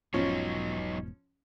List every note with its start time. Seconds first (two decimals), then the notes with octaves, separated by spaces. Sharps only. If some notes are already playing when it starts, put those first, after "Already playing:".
0.14 E1 G#2 F3 F#3 B3 C#4 D#4